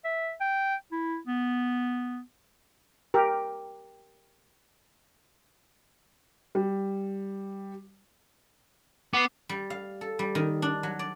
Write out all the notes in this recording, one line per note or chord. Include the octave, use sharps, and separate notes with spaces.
E5
G5
E4
B3
G4 A#4
G3
B3 D6 C7
G3
F5
A4
G3
D#3
D4
F#3
D5